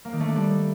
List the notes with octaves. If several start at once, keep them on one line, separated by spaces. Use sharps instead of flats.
A#3
D#3
A3
D4
G3